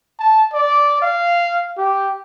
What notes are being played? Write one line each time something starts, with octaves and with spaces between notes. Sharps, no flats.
A5
D5
F5
G4